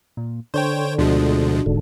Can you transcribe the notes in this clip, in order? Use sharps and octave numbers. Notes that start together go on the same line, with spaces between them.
A#2
D3 D4 C5 C#5 G5
D2 B2 F3 G#3 D4 F#4
D#1 G#2 D3